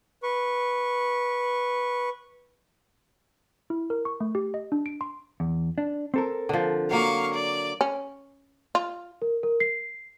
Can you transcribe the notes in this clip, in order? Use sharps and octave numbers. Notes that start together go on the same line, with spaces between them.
B4 C#6
E4
A#4
C#6
A3
G4
D#5
D4
D7
C6
E2
D4
C4 A4 A#4
D3 F3
F#3 A#3 F5 C#6
D5
C#4
F4
A#4
A#4
C7